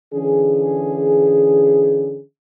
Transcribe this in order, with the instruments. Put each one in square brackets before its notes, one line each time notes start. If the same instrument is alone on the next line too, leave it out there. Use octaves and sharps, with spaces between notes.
[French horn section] D3 E3 C#4 G#4